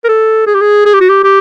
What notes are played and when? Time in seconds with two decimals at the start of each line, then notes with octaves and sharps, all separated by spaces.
0.04 A#4
0.09 A4
0.47 G#4
0.54 G4
0.61 G#4
0.86 G#4
0.94 G4
1.01 F#4
1.09 G4
1.24 G4